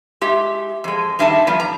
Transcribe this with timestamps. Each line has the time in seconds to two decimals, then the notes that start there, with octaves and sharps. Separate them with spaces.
0.21 G#3 G4 E5
0.84 F2 G#3
1.19 D#3 G3 D4 E5 G#5 A5
1.47 A2 F3 G3 B3
1.60 A#5